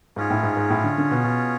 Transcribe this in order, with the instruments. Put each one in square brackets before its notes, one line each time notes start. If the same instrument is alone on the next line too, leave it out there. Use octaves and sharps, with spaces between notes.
[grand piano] G#2 [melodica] C#4 F4 G#4 C#5
[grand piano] A2
G#2
G#2
A2
D3
D3
B2
B2